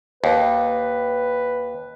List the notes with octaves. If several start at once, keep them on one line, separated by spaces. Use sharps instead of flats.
D#2 B4